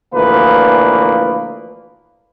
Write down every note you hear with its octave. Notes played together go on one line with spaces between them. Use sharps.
D2 A#2 E3 F3 A#3 B4